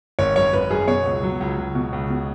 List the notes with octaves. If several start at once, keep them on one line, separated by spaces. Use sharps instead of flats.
G#1 C#5
F#2 C#5
G#1 B4
F#2 G#4
B2 C#5
C#2
F#3
C#2
C#2
B2
C#2
B2